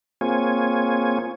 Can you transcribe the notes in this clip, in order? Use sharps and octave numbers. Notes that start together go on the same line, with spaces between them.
A#3 C4 F4 G#4 C#5 G#5